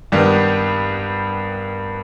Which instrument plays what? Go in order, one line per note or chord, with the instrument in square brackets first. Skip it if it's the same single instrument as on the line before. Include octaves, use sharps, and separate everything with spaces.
[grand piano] G2 D#3 G3 B3